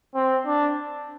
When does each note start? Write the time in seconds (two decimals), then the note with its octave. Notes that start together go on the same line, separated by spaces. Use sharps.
0.15 C4
0.46 D4